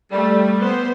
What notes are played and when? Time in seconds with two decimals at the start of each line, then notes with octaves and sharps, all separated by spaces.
0.12 G3 A3
0.60 B3 C5